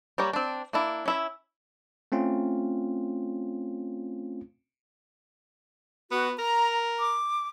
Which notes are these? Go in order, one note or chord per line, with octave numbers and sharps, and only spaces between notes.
G3 A#3 G4 C#5 A#5
C4 D4
A#3 D4 E4
C#4 E4 E5
A3 C4 C#4 F4
B3 F#4
A#4 A#5
D6